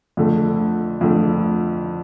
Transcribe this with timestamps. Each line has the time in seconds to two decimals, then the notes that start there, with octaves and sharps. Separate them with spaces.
0.17 F2 D3 A3
1.01 F2 D3 A3